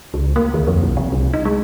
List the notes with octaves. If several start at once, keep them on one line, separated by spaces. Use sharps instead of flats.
C#2
A#3
D#2
F2
B1
C3
C2
D#4
G#3